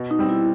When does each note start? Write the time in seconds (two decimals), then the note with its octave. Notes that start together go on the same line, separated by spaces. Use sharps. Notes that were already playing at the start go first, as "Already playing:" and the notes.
Already playing: B2
0.11 D#4
0.19 G3 C4
0.29 E4